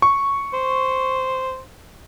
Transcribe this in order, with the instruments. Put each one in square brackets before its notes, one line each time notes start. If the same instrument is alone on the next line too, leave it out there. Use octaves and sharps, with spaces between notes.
[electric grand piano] C#6
[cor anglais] C5